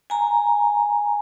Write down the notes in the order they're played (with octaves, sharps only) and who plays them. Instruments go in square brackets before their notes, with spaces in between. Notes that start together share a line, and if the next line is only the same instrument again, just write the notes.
[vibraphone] G#5 A#5